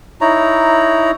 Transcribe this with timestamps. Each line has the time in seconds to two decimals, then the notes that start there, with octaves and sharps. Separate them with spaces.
0.21 D#4 E4 C#5 A#5